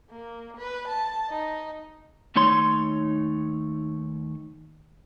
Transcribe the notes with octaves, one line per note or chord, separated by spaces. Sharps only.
A#3
B4
A5
D#4
D#2 A3 D#4 C#5 C6